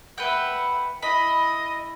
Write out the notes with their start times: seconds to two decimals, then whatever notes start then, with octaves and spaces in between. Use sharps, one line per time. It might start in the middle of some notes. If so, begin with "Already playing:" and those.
0.18 B4 E5 F#5 G5
1.02 E4 D#5 B5